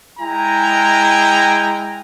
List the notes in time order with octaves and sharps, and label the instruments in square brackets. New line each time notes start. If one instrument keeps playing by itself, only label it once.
[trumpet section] G#3 E4 G5 G#5 A#5